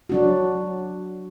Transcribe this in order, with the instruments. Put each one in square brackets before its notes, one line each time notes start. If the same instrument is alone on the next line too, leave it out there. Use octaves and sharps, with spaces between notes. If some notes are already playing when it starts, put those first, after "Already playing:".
[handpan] F#3 D4 F#4